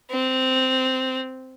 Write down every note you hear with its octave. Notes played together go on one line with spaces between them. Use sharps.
C4